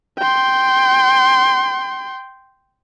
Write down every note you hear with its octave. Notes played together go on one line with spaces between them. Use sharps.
G5 C6